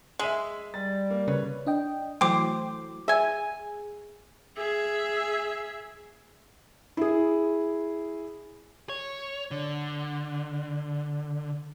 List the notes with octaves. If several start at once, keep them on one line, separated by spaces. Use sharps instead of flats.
G#3 E5 D#7 F#7
G3 A6
A#3
C#3 B4 C#5
D4 D#5 G5
E3 F#3 A3 C5 G5 D6
G#4 E5 G#5
G#4 E5
E4 G#4
C#5
D3